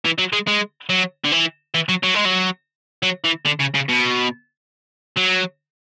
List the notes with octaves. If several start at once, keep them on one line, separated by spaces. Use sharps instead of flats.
E3
F#3
G#3
G#3
F#3
D3
E3
E3
F#3
F#3
G#3
F#3
F#3
E3
D3
C#3
C#3
B2
F#3